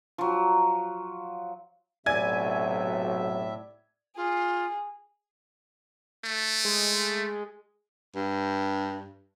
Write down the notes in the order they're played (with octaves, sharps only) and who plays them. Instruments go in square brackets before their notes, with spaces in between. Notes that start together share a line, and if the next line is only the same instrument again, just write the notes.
[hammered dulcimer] F3 F#3
[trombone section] B1 C3 F#3 [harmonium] A2 E5 [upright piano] D5 [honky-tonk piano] G#5 G#6
[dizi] F4 [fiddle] G#4
[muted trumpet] A3
[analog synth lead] G#3
[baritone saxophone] G2